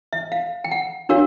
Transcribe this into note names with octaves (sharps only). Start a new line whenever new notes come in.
E5
F5
G5
F#5
D4 F#4 A#4 C#5 F5